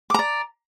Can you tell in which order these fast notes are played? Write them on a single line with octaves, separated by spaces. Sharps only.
D6 A#5 D5